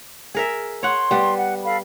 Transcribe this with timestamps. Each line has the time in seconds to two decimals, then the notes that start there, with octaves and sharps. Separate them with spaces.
0.35 G#4 A#4 E5
0.83 C#5 F#5 C6
1.11 G3 B3
1.37 F#5
1.64 A4 F5 B5